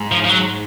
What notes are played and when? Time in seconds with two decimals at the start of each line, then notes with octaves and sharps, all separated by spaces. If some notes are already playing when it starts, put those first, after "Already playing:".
Already playing: G#2
0.12 F3
0.24 F3
0.29 F#3